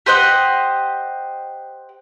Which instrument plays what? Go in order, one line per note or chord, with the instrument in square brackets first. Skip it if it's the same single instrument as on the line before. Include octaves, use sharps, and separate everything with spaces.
[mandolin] G4 C5 D#5 F#5